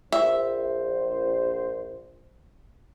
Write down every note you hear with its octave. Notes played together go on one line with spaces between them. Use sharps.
A#1 C5 E5